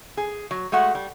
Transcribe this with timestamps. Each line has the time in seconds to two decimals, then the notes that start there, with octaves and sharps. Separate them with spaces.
0.17 G#4
0.51 F#3
0.72 G#3 A3 F#4 F#5
0.95 G3